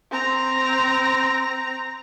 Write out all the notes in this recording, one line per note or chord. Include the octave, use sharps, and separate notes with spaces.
C4 A#5